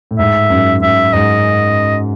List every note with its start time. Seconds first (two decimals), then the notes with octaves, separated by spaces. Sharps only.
0.11 A2
0.18 G#2 E5
0.50 F#2
0.82 F#2 E5
1.13 G#2 D#5